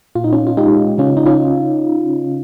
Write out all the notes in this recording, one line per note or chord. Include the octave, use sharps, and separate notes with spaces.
A#2 F4
D#4
C#4 F4
F4
G#3 D#4 G4
C#3 C#4 F4
D#4
C#4 F4